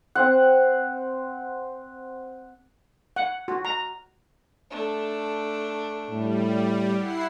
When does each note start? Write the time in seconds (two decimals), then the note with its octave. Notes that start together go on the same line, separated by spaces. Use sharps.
0.15 C4 C5 F#5
3.16 F#5
3.48 F#4
3.65 A#5
4.71 A3 D4
6.10 A2 G3
6.94 E4 F#5 C7